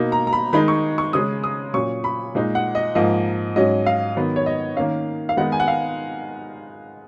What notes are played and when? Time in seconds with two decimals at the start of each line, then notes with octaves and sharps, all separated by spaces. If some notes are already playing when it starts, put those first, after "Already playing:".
Already playing: B2 A#3 D#4
0.12 A#5
0.27 A#5
0.33 B5
0.53 D#3 G#3 D#4 B5
0.68 C#6
0.98 C#6
1.13 C#3 G#3 C#4 D#6
1.44 D#6
1.74 A#2 F#3 C#4 C#6
2.04 B5
2.35 A#2 G#3 D#4
2.55 F#5
2.75 D#5
2.95 G#2 F3 A#3 D#5
3.56 G#2 F#3 C#4 D#5
3.86 F5
4.16 D#3 F#3 B3
4.36 C#5
4.46 D#5
4.77 D#3 A#3 C#4 F5
5.29 F5
5.37 D#3 G#3 B3 D#4 F#5
5.52 G#5
5.60 F#5
5.68 F5